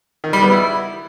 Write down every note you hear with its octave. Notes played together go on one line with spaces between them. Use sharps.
D#3
G3
B3
E4